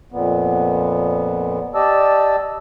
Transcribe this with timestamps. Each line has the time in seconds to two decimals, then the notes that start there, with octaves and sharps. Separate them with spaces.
0.12 F2 A#2 B3
1.75 G4 D5 D#5 A5 E6